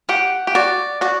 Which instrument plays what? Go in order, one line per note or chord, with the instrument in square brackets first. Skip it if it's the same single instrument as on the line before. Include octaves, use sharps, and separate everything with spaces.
[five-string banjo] G4 [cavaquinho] F#5
[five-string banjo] G4
[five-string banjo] F#4 [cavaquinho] D5
[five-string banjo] F#4 [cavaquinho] D5